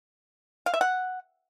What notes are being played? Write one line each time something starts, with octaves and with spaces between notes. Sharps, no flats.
F5
E5
F#5